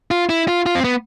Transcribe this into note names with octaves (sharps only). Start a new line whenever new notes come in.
F4
E4
F4
F4
C4
B3